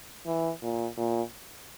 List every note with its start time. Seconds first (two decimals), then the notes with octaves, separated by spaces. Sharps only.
0.26 E3
0.62 A#2
0.97 A#2